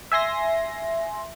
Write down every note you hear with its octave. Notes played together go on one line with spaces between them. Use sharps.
E5 G#5 C6 A#6